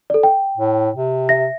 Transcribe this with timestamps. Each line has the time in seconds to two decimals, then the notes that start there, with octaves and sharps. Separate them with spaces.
0.10 A4 D5
0.23 G5
0.57 A2
0.96 C3
1.29 E5 A#6